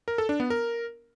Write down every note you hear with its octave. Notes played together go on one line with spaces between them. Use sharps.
A#4
A4
D4
B3
A#4